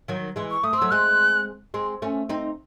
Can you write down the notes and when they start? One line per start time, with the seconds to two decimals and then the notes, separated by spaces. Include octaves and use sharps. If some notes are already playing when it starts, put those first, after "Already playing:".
0.08 D#3 F#3
0.36 E3 G#3
0.51 C#6
0.63 A3 D#6
0.73 C4
0.78 F#3 A3 E6
0.91 G#3 C4 F#6
1.74 G#3 C4
2.02 A3 C#4
2.29 C4 D#4